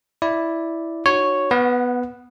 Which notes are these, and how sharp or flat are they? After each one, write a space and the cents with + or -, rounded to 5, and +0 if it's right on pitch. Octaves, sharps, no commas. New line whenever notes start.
E4 +0 D5 +0
D#4 -40 F#4 -10 C#5 +0
B3 +0 B4 +0 F#5 -30